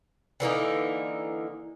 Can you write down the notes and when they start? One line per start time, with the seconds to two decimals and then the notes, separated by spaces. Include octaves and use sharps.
0.40 D3 E3 A#3 D#4